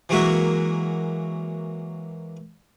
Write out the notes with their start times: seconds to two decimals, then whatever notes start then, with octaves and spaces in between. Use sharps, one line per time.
0.09 E3 F#3 G#3 A#3 F#4 E5